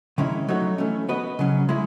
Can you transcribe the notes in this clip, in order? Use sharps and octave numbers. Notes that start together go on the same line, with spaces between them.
D#3 G#3 C#4 E4
F#3 A3 D#4 F#4 C#5
E3 A3 C#4
B3 F#4 B4 D#5
C#3 F#3 C#4
G#3 C#4 E4